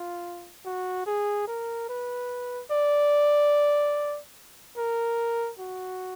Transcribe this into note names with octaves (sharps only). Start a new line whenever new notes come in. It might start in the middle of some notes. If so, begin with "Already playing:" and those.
Already playing: F4
F#4
G#4
A#4
B4
D5
A#4
F#4